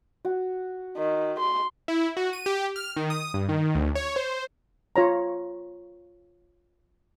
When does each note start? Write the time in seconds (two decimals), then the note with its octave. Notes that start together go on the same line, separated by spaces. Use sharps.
0.25 F#4
0.97 D#3
1.39 C6
1.88 E4
2.17 F#4
2.33 D#7
2.46 G4
2.76 F6
2.96 D#3
3.10 D#6
3.34 G2
3.49 D#3
3.75 D2
3.95 C#5
4.16 C5
4.96 F4 C#5 A#5